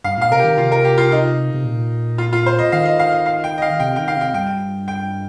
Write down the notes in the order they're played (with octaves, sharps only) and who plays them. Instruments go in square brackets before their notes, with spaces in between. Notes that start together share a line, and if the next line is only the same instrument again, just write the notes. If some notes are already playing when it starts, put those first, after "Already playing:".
[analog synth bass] G2 [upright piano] F5
[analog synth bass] A#2 [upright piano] F5
[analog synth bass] C3 [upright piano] A#4
[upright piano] G4
[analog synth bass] D#3
[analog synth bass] C3 [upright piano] F4
[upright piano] A#4
G4
F4
D#4
[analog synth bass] C3
A#2
[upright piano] F4
F4
C5
D#5
[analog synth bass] D#3 [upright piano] F5
[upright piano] D#5
F5
D#5
F5
G5
D#5
F5
[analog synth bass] C3 [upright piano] G5
[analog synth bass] D#3 [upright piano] G5
[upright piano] F5
[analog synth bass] C3
[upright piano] G5
[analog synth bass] G2 [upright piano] G5
[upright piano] G5